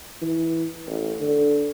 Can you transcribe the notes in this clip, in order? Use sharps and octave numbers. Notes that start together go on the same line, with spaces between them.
E3
A1
D3